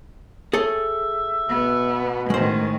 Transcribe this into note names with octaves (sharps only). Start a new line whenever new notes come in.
G#4 A4 C#5 E5
B2 B3
A2 D#3 G#3 C#4 C5